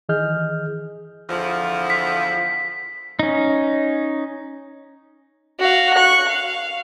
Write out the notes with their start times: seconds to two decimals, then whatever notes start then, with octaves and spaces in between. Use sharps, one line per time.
0.09 D#3 E3 G#4 D#5 F6 G6
1.29 E2 D3 F3
1.90 B6
3.19 C#4 D#4
5.59 F#4 F5
5.94 C#6 F#6
6.29 F5